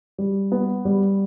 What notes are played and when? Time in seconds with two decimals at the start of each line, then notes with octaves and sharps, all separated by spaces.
0.18 G3
0.52 B3
0.85 G3